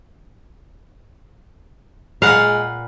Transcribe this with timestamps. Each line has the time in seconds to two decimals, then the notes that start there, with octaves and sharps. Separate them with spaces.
2.22 A#2 G#3 B4 F5 F#5